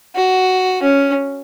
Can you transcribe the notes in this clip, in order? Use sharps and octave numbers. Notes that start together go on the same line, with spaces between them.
F#4
C#4